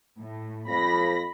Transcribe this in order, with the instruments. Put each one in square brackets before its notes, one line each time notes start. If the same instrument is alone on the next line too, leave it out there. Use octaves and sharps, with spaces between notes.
[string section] A2
[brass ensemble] F2 [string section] B5 A#6